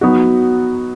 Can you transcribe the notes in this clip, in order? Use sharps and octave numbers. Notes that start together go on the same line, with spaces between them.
F#3 B3 D#4 F#4